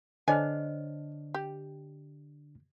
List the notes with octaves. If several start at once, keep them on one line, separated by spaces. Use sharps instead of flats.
D3 D4 C5 C#5 D#5 G#5 F6
G4